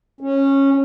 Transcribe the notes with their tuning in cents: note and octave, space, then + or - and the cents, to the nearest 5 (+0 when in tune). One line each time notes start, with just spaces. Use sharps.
C#4 -15